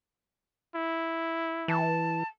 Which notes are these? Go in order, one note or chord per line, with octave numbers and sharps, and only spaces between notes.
E4
E3 A5